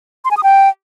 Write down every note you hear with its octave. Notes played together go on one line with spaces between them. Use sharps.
C6
G#5
D#6
G5